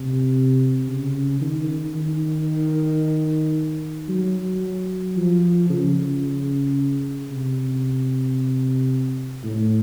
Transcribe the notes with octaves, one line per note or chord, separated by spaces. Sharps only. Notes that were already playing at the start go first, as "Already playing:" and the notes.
Already playing: C3
C#3
D#3
D#3
F#3
F3
C#3
C3
A2